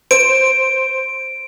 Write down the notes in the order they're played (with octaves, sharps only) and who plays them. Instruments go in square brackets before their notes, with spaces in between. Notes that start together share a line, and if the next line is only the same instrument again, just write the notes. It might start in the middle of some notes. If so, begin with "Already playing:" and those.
[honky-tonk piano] C5 [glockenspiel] D7